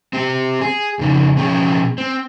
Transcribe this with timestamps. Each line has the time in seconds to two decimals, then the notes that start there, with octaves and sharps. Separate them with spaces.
0.13 C4 G4
0.61 G#4
0.99 F2 C#3 D#4
1.37 B2 F3 C#4 G#4 C#5 G5
1.98 C4